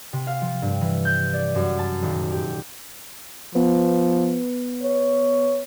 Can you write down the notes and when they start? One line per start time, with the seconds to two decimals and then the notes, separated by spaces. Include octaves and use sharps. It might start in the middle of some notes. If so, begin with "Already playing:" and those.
0.13 C3
0.27 F5
0.41 F3
0.62 G2
0.81 E3
1.05 G6
1.33 D5
1.55 F#2
1.79 A5
2.02 D#1
2.32 G4
3.55 F3 B3 B4
4.83 C#5